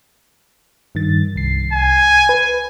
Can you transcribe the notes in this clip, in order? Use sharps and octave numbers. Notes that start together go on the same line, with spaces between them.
G2 D#3 A6
C2 C7
G#5
B4